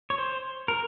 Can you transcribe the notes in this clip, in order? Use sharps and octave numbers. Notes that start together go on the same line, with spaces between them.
C#5
C5
A#4